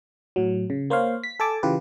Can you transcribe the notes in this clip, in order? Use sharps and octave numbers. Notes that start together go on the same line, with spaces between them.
A2 F#3
C#3
A#3 C5 C#5 F5
B6
A4 G#5 A5 D6
C#3 E3 F4 G4 B4